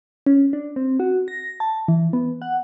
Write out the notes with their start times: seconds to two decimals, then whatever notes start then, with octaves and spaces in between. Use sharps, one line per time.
0.26 C#4
0.53 D4
0.76 C4
1.00 F#4
1.28 A#6
1.60 A5
1.88 E3
2.13 B3
2.42 F#5